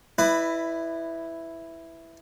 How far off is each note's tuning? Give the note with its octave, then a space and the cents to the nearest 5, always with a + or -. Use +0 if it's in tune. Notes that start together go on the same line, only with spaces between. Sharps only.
E4 +0 B4 +15 D#5 -45